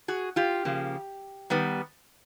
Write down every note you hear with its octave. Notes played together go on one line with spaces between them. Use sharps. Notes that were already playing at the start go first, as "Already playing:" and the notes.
F#4 G#4
F4 G4
C#3 F3 A#3
D#3 G3 B3